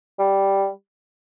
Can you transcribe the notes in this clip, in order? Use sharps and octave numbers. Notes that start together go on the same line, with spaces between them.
G3